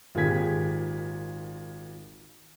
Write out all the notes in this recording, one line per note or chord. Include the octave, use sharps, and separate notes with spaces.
G#1 A#2 G4 G#4 G#6 B6